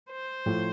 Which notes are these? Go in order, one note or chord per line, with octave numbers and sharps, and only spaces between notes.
C5
A2 F3 A3